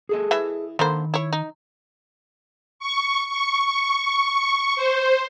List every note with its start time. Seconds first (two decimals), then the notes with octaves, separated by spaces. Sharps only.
0.09 G#4 A4 D#5
0.31 E3 E4 E5
0.79 D3 D#3 A#3 C5 B5
1.14 E4 C#5
1.33 D#4
2.79 C#6
3.29 C#6
4.76 C5